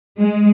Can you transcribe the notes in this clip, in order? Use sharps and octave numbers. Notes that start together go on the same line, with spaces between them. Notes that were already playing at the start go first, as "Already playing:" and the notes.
G#3